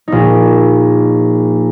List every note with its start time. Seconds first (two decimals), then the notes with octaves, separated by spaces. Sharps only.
0.08 A#1 D#4